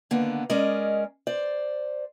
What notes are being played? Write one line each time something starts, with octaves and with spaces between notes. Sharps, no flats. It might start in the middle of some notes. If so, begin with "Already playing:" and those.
D3 D#3 A#3 B3 F#5
G#3 C#4 A#4 D5 D#5
C5 D5